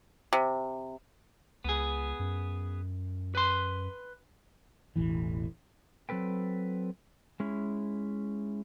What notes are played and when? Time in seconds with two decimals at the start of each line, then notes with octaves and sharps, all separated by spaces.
0.33 C3
1.64 C#2 B3 G#4
2.19 F#2
3.35 B4 C6
4.96 E1 A1 E3
6.09 F#3 C4 A4 B4 G5
7.40 G#3 C#4 E4